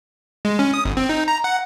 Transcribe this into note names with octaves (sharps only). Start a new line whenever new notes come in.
G#3
C#4
D#6
G1
C4
D#4
A#5
F#5